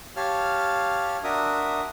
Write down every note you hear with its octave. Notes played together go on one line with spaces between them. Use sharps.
G4 C#5 F5 A5 F6
D4 F#4 A#4 E5 D#6